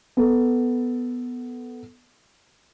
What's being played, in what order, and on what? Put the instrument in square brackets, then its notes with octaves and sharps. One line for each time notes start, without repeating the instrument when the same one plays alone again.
[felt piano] B3 A4